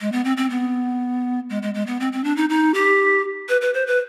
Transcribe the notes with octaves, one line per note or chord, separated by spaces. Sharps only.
G#3
B3
C4
C4
B3
G#3
G#3
G#3
B3
C4
C4
D4
D#4
D#4
G4
B4
B4
C5
B4